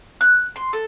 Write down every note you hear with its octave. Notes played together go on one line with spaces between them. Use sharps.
F#6
C6
A4